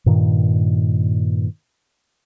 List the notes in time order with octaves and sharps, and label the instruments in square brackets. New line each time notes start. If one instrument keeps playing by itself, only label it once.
[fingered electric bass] G2 A#2 D#3